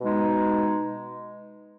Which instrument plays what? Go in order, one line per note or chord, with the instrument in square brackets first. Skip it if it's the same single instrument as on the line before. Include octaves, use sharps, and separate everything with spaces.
[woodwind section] B2 G#3 D#4